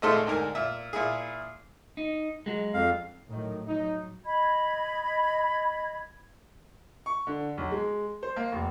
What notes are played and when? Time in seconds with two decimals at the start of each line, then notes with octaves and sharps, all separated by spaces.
0.02 G#1 A#2 G#3 A3 A4 C6
0.27 D2 G#2 A#4 G#5
0.55 A#2 E5
0.93 A#2 E4 G#4
1.97 D#4
2.46 F#3 G#3
2.74 F2 F5
3.29 A2 D#3 F#3
3.66 F#3 D#4
4.25 D#5 B5 G#6
7.06 C#6
7.27 D3
7.57 B1
7.72 G#3
8.23 C5
8.36 A#3
8.52 F1